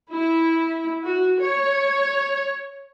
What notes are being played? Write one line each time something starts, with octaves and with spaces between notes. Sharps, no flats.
E4
F#4
C#5